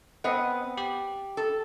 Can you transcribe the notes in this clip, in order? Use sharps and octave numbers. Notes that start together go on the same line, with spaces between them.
B3 C4 B4 D#5 F#5
G4
A4